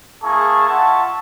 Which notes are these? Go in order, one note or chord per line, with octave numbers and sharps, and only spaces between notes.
A#3 E4 G#4 A5 C#6
F4 E5 F#5 A5 C#6